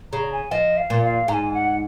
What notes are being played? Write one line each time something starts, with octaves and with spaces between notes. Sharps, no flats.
C#3 A#5
G#5
F3 D#5
F5
A#2
F5
G#2 A#5
G#5
F#5